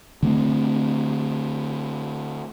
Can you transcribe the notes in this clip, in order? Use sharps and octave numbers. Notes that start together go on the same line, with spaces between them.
D3 A3 C4